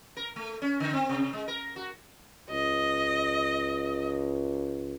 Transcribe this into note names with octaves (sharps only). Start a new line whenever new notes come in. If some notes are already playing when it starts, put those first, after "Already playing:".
A#4
A3
C#4
D3
C4
C3
G#3
A#4
F#4
C#2 D#5